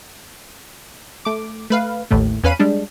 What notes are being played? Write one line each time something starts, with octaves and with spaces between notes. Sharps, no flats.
A3 D6
A3 B4 F5
A1 D#2 A2 A3
E2 C#4 B4 F5 B5 D#7
G3 G#3 D4